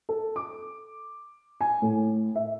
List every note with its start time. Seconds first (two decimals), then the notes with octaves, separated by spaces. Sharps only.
0.09 A4
0.36 D6
1.61 G#5
1.82 A2
2.36 E5